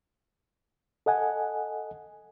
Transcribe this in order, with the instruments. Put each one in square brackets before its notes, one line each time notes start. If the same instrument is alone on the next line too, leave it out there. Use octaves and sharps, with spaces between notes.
[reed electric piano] A4 D#5 F#5 G#5